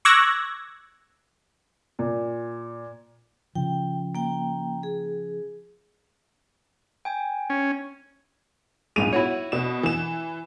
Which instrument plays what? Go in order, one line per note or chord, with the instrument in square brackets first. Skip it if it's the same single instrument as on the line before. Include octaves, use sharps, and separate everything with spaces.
[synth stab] C#6 D6 E6 F#6 G#6 A#6
[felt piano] A#2
[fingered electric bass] C#3 F3 [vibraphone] G5
[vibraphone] A#3 G5
G#4
[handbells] G5 G#5
[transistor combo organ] C#4
[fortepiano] A#1 G#2 G#3 [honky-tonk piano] D#7 F7
[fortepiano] E4 F#4 C#5
[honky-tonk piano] B2 E7
E3 E7